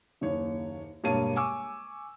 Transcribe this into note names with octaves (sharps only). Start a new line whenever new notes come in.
F#1 D#2 C#5
E1 G2 A#3 C#5 A5 D#7
G#5 C#6 D6 E6